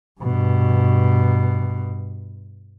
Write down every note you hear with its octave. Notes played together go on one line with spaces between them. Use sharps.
G2 B2